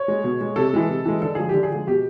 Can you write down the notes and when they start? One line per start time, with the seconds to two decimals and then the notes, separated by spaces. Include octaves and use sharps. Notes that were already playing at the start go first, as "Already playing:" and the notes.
Already playing: C#5
0.08 G#3
0.24 B2
0.41 G#3
0.56 C3 A4
0.73 E3 G#3
0.89 C3
1.05 E3 G#3
1.22 D3 A4
1.35 F3 G#3 G#4
1.49 D3 G4
1.63 G#4
1.71 F3 G#3
1.87 B2 G4